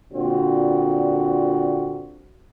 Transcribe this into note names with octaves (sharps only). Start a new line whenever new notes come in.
A#2 D3 C4 F4 F#4